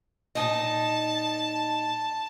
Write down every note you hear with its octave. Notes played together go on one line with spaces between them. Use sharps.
A#2 D#4 D#5 A5